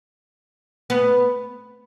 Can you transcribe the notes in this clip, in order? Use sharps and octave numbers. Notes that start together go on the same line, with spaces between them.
B3